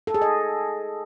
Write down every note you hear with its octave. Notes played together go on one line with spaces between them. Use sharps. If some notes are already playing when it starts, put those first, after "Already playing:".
A4
G#4
D#5